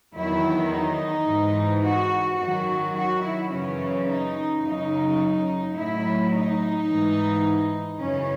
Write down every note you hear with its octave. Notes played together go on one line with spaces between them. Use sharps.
E2 D#3 F#3 E4
D#4
G#2 E3
F#4
F#2 D#3 F#3 F#4
F#4
E4
F#2 C#3 E3 C#4
D#4
F#2 C#3 F#3 D#4
A2 F#3 E4
D#4
G#2 E3
F#2 C#3 E3 C#4